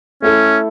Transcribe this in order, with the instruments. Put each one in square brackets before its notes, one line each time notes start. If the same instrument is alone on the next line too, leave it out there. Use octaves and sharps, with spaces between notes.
[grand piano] A3 E4 A4 [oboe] C#4